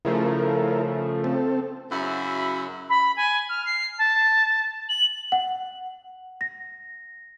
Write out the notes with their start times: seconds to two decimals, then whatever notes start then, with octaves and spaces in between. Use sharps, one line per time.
0.05 C#3 F3 A3 E4 A#4
1.24 C4 A4
1.91 F#2 C#3 E4 F#4 E5 B5
2.89 B5
3.16 G#5
3.49 F6
3.65 C7
3.98 A5
4.89 F#7
5.32 F#5
6.41 A#6